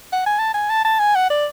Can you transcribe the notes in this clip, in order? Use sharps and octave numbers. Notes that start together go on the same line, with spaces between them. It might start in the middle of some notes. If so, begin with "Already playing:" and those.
F#5
G#5
A5
G#5
A5
A5
G#5
F#5
D5